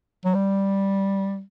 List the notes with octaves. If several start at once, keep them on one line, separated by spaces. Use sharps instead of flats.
F#3
G3